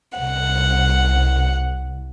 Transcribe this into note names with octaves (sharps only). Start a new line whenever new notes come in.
C2 F#5